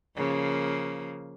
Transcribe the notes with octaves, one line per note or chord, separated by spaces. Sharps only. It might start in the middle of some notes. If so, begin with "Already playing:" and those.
C#3 F3 A#3